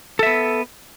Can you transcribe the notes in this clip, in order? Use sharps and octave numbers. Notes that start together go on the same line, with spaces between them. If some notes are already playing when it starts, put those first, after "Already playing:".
B3 A4 E5